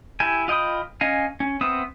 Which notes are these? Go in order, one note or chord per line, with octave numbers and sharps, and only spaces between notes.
E4 G4 G#5
F4 D#5 G5 B5 D#6
C#4 D#5 F5 G#5
C#4
B3 C4 B4 E5 D#6